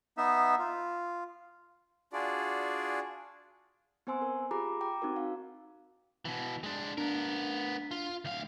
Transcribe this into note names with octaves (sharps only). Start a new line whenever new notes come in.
B3 D#4 E5
F4
D4 F4 F#4 G#4 D5
B3 C4 C5 G#5 C6 E6
A#4
F4 G4 G#4 A#5 B5 D6
G5 A#5 D6
C4 D#4 F#4 A#4
F5
B2 E3
G#3 D4
B3 D4 A#4
F4
D2 F5